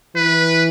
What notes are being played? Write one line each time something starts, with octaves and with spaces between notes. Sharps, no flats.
E3 B4